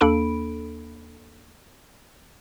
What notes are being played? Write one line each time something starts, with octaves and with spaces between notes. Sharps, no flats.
D#2 A#3 D4 A4 B5 D7